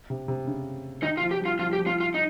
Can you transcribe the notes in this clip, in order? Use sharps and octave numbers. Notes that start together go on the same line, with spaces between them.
C3
C3
C#3
D#3 D#4
F4
F3
G4
G3
F4
F3 F4
G3 G4
F3
F4
F4
D#4